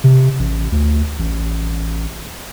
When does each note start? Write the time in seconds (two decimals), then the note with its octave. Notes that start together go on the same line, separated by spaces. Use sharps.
0.04 C3
0.39 A1
0.72 D2
1.19 A1